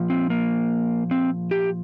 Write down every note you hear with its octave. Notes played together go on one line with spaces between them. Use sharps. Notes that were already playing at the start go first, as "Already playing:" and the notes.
Already playing: A#2 F3
C4
A#3
C4
G4